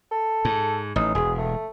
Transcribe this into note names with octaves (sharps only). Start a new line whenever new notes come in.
A4
G#2
A1 D#4
E1 G#4
A3